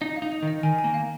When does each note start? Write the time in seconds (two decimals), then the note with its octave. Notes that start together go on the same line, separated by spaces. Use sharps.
0.01 D#4 D#5
0.16 F5
0.22 D#4
0.32 D#5
0.42 D#3
0.48 D#5
0.63 D#3 G#5
0.78 G#5
0.84 A#3
0.94 F5